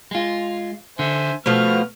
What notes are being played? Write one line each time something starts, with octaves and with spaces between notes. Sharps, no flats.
G#3 F4
D3 C5 E5 G#5
B2 F3 A3 B3 F6